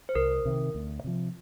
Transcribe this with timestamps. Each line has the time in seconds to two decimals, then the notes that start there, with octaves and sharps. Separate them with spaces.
0.09 C5
0.15 C2 A#4
0.45 C3 D#3
0.75 D2
1.04 C3 F3